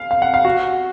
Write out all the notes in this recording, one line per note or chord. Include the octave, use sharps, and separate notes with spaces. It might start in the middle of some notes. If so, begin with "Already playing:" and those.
Already playing: F5
F5
F#5
F5
F#4